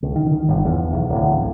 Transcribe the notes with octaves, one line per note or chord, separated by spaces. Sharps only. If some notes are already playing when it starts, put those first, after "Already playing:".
C#2
D#3
D#3
G1
E2
B1
D1
A1